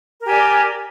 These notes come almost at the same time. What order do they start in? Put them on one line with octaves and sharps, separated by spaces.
A#4 G4 G#5 D5